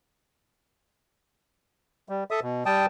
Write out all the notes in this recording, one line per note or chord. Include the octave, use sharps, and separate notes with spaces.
G3
A4 E5 D#6
B2
G3 G5 A5 D#6